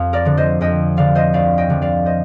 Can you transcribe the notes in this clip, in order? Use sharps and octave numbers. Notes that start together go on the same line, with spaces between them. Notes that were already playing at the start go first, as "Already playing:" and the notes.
Already playing: F2 F5
A#4 D5
D3 F3
C5 D#5
F2 D#5 G5
D3 F3 D5 F5
C5 D#5
D2 D5 F5
D#5 G5
D3 F3
D5 F5
C5 D#5